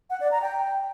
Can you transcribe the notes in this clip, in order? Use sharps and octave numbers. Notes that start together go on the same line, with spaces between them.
F#5
D5
A#5
G5